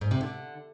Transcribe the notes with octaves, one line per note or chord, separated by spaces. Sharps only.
G#2
C3
D3